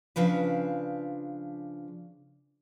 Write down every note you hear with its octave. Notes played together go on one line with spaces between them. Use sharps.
C#3 F3 D4 B4